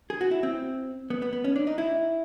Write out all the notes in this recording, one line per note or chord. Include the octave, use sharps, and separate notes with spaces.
G#4
F#4
E4
C4
B3
B3
B3
C#4
D4
D#4
E4